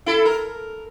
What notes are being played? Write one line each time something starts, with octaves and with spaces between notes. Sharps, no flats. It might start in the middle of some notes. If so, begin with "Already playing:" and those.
E4 A4
A#4